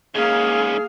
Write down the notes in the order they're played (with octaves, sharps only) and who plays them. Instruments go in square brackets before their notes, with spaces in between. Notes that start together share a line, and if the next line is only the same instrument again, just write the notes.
[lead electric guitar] G#2 C#4 [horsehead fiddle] A#3 F5 [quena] G#4